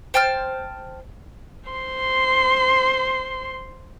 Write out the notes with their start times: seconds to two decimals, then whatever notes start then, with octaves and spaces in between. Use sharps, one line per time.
0.14 C5 G5 A5 F6
1.70 C5 C6